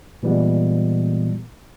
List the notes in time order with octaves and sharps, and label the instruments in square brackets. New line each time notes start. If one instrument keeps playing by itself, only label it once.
[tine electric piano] A#2 E3 G3 G#3 B3